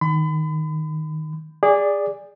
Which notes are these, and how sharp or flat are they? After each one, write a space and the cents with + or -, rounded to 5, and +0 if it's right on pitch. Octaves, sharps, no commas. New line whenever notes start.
D#3 +0 B5 +35
G#4 -25 D5 -5